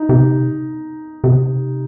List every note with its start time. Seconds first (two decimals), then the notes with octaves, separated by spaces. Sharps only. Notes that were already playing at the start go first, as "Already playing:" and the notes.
Already playing: D#4
0.09 C3
1.24 C3